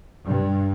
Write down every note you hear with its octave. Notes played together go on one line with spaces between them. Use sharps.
G2